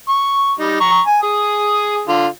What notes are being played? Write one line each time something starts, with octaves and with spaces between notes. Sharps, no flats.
C#6
G3 D#4
A#5 C#6
G#5
G#4 D#6
D3 F4